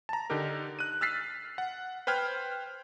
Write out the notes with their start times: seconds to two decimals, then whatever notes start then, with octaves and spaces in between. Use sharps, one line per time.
0.09 A5 A#5
0.30 D3 D4 D#4 G4 A#4
0.79 F#6 D#7
1.01 E6 F6 A6 B6 C7
1.58 F#5
2.07 B4 C5 G5 F6 G#6